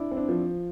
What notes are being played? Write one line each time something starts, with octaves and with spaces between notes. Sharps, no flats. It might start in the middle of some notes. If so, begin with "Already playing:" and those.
Already playing: D4 E4
C4
D4
F3